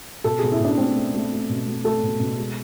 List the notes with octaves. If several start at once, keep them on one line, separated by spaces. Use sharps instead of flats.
B2 A4
B2 G#4
E4
B2 D4
A3 C4
A3
A3
A3
B2
A3
A3 A4
B2
B2
G#3